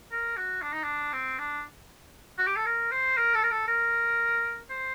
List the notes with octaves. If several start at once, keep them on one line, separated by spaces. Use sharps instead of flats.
A#4
F#4
D4
D#4
D4
C4
D4
F#4
G4
A4
A#4
C5
A#4
A4
A#4
A4
A#4
C5